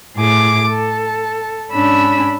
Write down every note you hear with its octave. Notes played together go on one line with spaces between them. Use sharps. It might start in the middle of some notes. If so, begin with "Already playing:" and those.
A2 G#4 D6
A4
G#2 C#4 D4 B5 E6